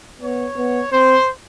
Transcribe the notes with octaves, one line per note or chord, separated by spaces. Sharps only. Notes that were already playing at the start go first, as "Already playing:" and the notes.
B3 C#5
B3
C4 C5